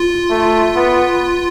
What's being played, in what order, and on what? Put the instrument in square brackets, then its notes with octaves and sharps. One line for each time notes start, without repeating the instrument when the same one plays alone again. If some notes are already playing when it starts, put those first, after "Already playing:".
Already playing: [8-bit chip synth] F4
[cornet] A3
B3